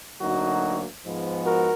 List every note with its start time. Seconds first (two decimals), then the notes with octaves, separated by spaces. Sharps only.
0.20 D2 D3 F#3 A#3 D#4 F#4
1.04 G#2 F3 G#3 B3
1.45 F#4 A#4